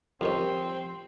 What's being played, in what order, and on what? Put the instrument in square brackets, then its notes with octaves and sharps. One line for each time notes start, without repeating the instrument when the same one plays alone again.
[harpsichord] F2 D#3 C#4 [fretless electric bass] F3 [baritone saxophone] C4 [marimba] G4